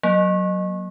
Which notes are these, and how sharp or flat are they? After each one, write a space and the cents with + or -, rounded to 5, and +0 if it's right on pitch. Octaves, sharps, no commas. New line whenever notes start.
F#3 +0 A#3 +30